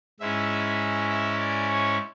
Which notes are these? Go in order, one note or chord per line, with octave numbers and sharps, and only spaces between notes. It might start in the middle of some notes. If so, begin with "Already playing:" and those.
G#2 G#3 C#4 E4 E5
E5
D5
C#5